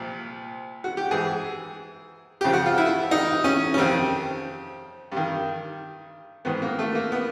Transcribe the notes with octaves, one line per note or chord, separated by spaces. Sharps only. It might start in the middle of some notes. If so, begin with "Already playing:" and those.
Already playing: C2 A#2 F3
F#4
G4
G#2 E3 G#4
F2 C#3 F3 G4
F#4
F4
E4
D#4
C#4
C#4
F2 C3 D#3 C4
G2 D#3
G#2 D#3 B3
A#3
A3
A#3
B3